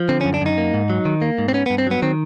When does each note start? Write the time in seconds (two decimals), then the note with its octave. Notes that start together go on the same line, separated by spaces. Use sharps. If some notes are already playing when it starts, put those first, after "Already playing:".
Already playing: F3
0.09 D3 C4
0.21 C#4
0.25 F#2
0.34 D4
0.41 F#2 D#4
0.58 A#3
0.74 G#2
0.90 F#3
1.05 D#3
1.22 A#3
1.38 G#2
1.48 C4
1.54 B3 C#4
1.66 B3
1.70 G2
1.78 C4
1.87 F#3 B3
2.02 D#3 C4